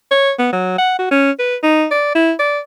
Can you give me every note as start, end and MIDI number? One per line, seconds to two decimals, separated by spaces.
0.11 0.32 73
0.38 0.49 59
0.52 0.75 54
0.78 0.94 78
0.99 1.07 66
1.11 1.31 61
1.39 1.56 71
1.63 1.86 63
1.91 2.11 74
2.15 2.32 64
2.39 2.59 74